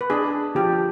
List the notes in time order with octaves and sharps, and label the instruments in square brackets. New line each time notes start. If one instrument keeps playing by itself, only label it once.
[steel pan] B4
[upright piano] D4 [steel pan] G#4
[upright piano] F3 [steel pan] G4